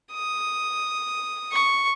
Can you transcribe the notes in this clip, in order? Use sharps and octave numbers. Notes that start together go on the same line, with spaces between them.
D#6
C#6